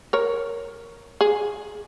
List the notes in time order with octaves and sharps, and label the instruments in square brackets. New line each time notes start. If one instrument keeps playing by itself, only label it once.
[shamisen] A#4 C#5
G#4